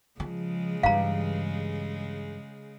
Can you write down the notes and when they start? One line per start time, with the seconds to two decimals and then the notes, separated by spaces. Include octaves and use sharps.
0.20 C#3 F3 G#3
0.83 G2 E3 F5 A#5